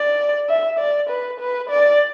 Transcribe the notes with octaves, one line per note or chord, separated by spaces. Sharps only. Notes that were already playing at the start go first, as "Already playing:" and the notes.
Already playing: D5
E5
D5
B4
B4
D5